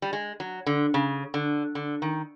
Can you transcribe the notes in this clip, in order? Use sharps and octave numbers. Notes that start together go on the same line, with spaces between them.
G3
G#3
F#3
D3
C#3
D3
D3
D#3